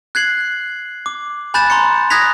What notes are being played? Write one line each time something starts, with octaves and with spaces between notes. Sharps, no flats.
F#6 G#6 C7 F#7
D6
G#5 B5 F#6 G6 A6 E7
A#5 C6 A6 C#7
D#6 F#6 G#6 A#6 B6 F7